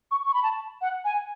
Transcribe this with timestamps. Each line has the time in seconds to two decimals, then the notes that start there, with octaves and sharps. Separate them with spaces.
0.11 C#6
0.26 C#6
0.34 B5
0.43 A5
0.81 F#5
1.05 G#5